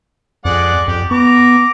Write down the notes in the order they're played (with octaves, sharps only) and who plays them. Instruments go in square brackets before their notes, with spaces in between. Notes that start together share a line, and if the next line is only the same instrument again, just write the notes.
[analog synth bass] F2 [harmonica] G#3 D5 F#5
[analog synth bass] F2 [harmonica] G4
[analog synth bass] B3 [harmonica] A#5 D6